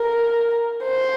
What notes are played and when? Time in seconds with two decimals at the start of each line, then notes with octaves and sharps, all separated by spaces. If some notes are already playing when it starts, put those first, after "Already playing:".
Already playing: A#4
0.84 C5